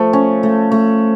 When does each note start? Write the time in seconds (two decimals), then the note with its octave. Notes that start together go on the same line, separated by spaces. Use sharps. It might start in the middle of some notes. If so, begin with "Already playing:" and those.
Already playing: F3 A3
0.13 C#4
0.43 A3
0.72 A3